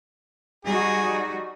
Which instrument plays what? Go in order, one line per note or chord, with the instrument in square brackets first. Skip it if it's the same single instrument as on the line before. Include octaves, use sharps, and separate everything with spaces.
[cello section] G3 D#4 F#4 [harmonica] G#4